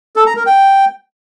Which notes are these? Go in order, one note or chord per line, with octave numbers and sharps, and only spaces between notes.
A4
A#5
A#4
G5